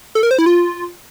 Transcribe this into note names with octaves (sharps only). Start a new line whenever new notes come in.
A4
A#4
C5
E4
F4